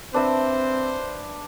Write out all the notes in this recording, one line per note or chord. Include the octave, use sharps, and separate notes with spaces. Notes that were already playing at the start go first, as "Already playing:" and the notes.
C4 D4 B4 C5 E5